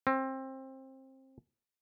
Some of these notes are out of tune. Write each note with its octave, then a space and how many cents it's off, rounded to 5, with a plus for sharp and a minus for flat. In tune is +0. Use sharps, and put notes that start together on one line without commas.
C4 +20